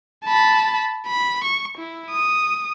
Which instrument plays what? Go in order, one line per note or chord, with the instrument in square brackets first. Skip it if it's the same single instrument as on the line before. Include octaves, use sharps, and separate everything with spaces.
[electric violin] A5 B5
B5
C#6
E4
D#6